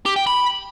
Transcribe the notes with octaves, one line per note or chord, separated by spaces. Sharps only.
G4
G5
B5